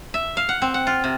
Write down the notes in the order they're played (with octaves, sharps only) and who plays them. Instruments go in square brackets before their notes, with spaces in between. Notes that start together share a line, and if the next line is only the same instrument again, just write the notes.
[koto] E5
F5
F#5
C4
F#5
F4
C3